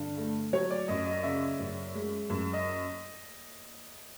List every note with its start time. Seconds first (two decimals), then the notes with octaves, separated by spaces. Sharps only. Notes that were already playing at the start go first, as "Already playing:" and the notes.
Already playing: G2 D3
0.17 A3
0.53 F#3 C#5
0.71 D5
0.88 F#2 D#5
1.06 D#5
1.23 C#3 E5
1.59 F#2
1.95 G#3
2.30 F#2
2.53 D#5